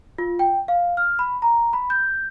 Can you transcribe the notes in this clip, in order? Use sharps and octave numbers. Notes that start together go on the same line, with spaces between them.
F4
G5
F5
F6
B5
A#5
B5
G6